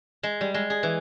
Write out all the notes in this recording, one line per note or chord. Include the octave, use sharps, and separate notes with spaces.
G#3
G3
G#3
G#4
E3